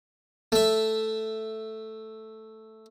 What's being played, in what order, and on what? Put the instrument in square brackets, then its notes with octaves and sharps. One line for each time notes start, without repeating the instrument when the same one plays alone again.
[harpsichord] A3 E5